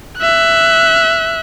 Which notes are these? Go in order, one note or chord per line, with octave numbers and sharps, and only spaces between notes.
E5 F#6